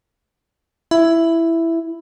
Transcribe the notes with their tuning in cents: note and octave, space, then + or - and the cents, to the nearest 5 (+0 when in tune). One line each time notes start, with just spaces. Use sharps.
E4 +5